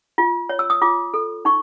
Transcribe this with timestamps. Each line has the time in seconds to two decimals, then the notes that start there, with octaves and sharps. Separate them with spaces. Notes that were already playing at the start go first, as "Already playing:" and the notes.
0.18 F4
0.49 C#5
0.59 E6
0.70 D#6
0.82 F4 D6
1.14 A4
1.45 D#4 C#6